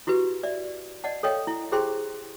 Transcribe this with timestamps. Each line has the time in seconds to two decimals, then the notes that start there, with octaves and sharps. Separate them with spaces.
0.07 E4 F#4 G4 B4
0.43 D5 E5
1.04 D5 D#5 F#5 A5
1.23 A4 A#4 C#5 D#5 F5 G5
1.47 E4
1.72 E4 G4 G#4 C5 G5 C6